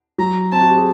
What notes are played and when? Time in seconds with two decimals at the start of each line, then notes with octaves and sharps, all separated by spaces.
0.18 F#3 A#5
0.52 C4 A5
0.61 F#4
0.70 G4
0.77 G#4